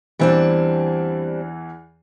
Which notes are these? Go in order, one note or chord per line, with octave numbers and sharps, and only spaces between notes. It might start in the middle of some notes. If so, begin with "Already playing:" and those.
E2 E3 G3 C4 D4